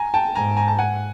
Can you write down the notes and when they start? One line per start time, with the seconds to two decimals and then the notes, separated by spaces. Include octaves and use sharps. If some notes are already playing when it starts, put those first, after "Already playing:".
Already playing: G#5 A#5
0.14 G5 A5
0.35 G#2 G#5 A#5
0.57 G#5 A#5
0.68 A5
0.79 F#5 G#5